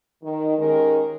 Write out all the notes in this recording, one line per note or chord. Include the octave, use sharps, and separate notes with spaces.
D#3
D#3 G#3 C#4 G4 A#4